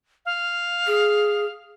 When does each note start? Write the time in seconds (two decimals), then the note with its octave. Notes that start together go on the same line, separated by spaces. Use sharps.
0.26 F5
0.87 G#4